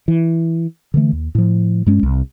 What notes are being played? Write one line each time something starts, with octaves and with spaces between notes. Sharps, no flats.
E3
D3 E3 A3
D#2
A2 F3
G2 G#3 C#4
C2